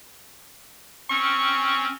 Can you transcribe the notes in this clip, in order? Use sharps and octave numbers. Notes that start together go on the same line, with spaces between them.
C4 C#4 C#6